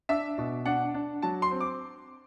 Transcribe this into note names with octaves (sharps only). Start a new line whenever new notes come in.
D4 E5
B2
D4 F#5
D4
F#3 A5
C6
C4
D6